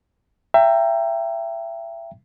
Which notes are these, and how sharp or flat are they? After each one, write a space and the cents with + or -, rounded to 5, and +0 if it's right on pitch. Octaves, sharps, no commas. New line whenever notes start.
E5 +25 G5 +0 A#5 -15